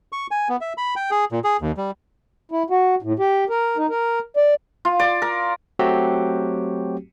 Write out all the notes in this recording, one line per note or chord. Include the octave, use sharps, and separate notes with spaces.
C#6
G#5
B3
E5
B5
G5
G#4
A#2
G#4
D#2
G3
E4
F#4
A2
G4
A#4
D#4
A#4
D5
F4
D5
A#4
F#3 A3 C4 F#4 G4